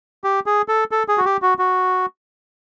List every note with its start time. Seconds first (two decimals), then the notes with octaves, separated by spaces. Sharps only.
0.24 G4
0.46 G#4
0.68 A4
0.91 A4
1.08 G#4
1.18 F#4
1.25 G4
1.42 F#4
1.59 F#4